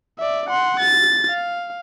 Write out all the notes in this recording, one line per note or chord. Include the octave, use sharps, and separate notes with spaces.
D5 E5
F#5 C6
A6
F5